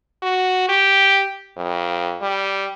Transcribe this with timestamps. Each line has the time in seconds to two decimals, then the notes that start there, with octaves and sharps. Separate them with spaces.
0.22 F#4
0.68 G4
1.57 F2
2.21 G3